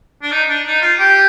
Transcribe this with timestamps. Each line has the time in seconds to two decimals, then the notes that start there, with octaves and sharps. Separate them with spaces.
0.22 D4
0.31 D#4
0.49 D4
0.65 D#4
0.82 F4
0.99 G4